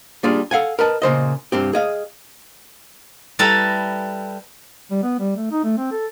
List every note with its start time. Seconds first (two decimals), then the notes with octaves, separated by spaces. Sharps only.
0.23 G3 A#3 D4 F4 G#4
0.51 A4 F5 F#5 G#5
0.79 A#4 B4 D#5 A5
1.02 A#2 C#3 C5 D#5
1.52 G2 C4 G4
1.73 G#4 D#5 F5
3.39 G3 E4 A4 B4 A5 A#5
4.91 G3
5.03 B3
5.20 G3
5.37 A3
5.52 D#4
5.64 A3
5.77 C4
5.92 A4